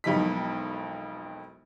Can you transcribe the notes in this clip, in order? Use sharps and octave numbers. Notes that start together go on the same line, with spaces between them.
E1 B1 F2 D#4 B6